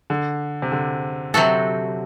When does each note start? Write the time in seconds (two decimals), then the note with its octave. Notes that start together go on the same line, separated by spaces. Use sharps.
0.10 D3
0.62 C3
0.72 D3
1.34 C3 F#3 C4 F#4 A4